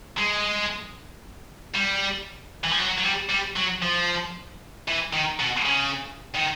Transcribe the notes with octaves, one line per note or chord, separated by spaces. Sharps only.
G#3
G3
E3
F3
F#3
F#3
G3
G3
F#3
F3
E3
D#3
B2
C#3
D#3